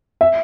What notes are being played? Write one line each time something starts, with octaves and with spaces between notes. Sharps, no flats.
E5